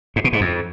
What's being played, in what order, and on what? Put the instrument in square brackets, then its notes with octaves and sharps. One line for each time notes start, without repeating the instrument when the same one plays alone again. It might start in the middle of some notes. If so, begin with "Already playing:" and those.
[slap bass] G#2
B2
G#2
F2